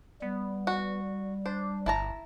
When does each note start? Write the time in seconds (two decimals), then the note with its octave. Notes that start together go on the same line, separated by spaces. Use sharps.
0.22 G3 B3
0.67 F#4
1.46 D4 C5
1.86 G1 E4 A5 A#5